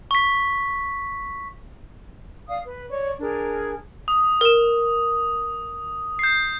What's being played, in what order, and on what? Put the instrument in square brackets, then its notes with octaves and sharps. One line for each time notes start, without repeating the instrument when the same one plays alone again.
[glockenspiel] C#6 B6
[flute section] D5 F5 D#6
B4
C#5 D5 C#6
D4 G#4 A#4
[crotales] D#6
[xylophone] A#4 E7
[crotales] G6 C7